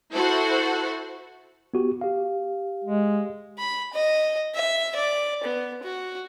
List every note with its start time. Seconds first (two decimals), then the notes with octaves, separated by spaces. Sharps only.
0.13 E4 F#4 A4 C5 F#5
1.74 B3 F#4 G4
2.01 G4 F5
2.84 G#3
3.58 B5
3.93 D#5
4.54 E5
4.95 D5
5.43 B3
5.83 F#4